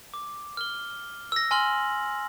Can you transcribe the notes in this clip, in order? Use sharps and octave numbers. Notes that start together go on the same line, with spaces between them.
D6
F6 G7
E6 A#6
G#5 C6 F6 F#7